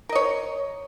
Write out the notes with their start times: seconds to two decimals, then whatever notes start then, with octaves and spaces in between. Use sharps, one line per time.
0.09 A#4
0.12 D#5
0.15 C#5